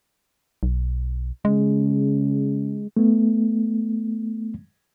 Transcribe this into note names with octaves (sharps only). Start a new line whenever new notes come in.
B1
C#3 G#3
A3 B3